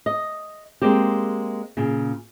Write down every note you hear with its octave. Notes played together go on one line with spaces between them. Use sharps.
D#5
G#3 A#3 C4 G4
A#2 C#3